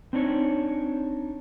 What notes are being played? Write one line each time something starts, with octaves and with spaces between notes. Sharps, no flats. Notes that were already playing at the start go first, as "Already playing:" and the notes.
C4 D4 D#4 C#5